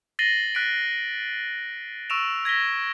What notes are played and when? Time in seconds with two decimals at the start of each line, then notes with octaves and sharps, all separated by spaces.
0.19 A6 A#6 C7 D#7 F#7 G7
0.55 F#6 A6 B6 D7
2.10 C#6 E6 D7 E7 F7
2.45 G#6 A#6 B6 G7